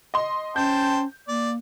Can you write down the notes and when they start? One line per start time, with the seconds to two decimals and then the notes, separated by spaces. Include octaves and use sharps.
0.14 D#5 C6
0.56 C#4 C5 G5 A5 G6
1.28 A#3 D5